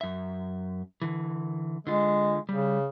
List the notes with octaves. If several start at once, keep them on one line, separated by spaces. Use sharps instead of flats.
F#2 E5
D3 E3
D3 G#3 F4
C#3 G3